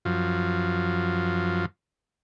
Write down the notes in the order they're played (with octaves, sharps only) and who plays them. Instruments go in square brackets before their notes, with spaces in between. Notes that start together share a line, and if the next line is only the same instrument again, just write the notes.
[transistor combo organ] F#2 F3